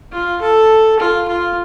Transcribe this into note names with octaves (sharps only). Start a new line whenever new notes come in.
F4
A4
F4
F4